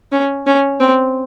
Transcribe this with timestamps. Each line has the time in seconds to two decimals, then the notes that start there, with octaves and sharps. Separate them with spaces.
0.12 C#4
0.46 C#4
0.80 C4